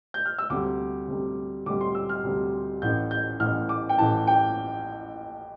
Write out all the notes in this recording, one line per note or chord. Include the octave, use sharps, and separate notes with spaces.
G6
F6
E6
D2 C3 G3 D6
D2 C3 G3
D2 C3 G3 D6
C6
E6
F6
D2 C3 G3
A1 A2 E3 G6
G6
A1 A2 E3 F6
D6
G5
A1 A2 E3 A5
G5